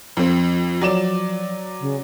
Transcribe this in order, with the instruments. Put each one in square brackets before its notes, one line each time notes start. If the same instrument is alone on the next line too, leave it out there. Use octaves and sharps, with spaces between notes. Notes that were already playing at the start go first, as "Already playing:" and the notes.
[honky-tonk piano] F2 C4 [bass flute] F3
[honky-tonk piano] F#3 D5 E7
[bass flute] C#3